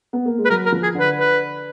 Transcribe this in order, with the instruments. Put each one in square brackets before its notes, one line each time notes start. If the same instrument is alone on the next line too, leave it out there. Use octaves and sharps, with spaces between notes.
[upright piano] B3
A#3
G#3
[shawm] B4
[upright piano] F#3 [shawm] A#4
[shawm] A#4
[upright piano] F3
[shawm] G#4
[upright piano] D3
[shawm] B4
B4